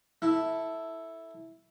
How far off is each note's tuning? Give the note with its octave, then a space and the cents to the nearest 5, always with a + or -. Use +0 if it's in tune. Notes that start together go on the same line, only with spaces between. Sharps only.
E4 -10 A4 +0